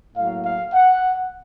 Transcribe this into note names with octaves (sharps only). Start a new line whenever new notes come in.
A2 F#3 A#3 F5
F5
F#5